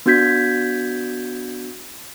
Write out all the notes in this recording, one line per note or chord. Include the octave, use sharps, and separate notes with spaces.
B3 D4 F#4 G6 G#6 B6